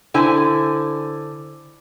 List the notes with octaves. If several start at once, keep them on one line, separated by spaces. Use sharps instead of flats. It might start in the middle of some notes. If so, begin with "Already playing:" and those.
D3 E4 C5 G#5